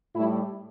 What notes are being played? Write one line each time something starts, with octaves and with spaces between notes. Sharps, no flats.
A2 G3 E4